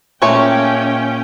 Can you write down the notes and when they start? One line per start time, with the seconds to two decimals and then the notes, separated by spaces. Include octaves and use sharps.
0.22 A#2 G#3 A3 C#4 C#5 G5